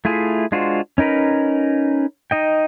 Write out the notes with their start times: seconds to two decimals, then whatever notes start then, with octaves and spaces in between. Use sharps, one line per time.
0.05 A3 E4 F4 G#4
0.52 G#3 D4 F4 F#4 C5
0.98 C#4 D#4 A#4 B4
2.31 D#4 D#5 G5